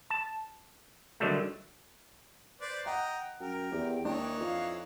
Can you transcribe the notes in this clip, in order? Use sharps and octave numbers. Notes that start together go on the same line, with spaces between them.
A5
D3 D#3 F#3 G3 A3
B4 C5 D5
D#5 F#5 G5 A#5
F#2 A#4 G5
E2 G4
D#2 E3 D4 D#4 C#5 D5
F2 F5